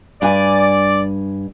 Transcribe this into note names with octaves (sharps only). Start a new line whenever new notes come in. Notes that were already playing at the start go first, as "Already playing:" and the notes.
G2 D5 G#5